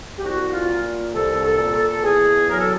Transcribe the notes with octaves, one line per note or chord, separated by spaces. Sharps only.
G4
C2 F#4
F4
A#2
C2 A4
A4
A#2
A4
E2 G#4
F#3 A#4
A4